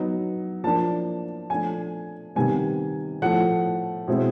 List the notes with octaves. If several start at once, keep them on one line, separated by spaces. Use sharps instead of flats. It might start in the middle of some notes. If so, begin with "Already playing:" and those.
Already playing: F#3 B3 D#4
F3 A#3 D4 A5
F3 A3 D4 G#5
C3 D#3 G3 B3 G#5
A2 F3 A3 F#5
B2 G#3 C4 E4